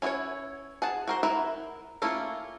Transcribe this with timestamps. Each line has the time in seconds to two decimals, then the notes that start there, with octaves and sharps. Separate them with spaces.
0.02 C#4 E4 G#4 B4 C#5
0.82 G#4 F#5 A5
1.08 F#4 A#4 C5
1.23 E4 A#4 B4 E5
2.02 A3 A#3 C#4 E4 F4